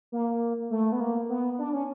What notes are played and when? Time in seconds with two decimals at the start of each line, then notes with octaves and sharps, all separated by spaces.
0.12 A#3
0.70 A3
0.92 B3
1.00 A#3
1.29 B3
1.59 D4
1.73 C#4